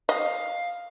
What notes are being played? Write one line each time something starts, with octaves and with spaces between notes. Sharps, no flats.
D#5 F5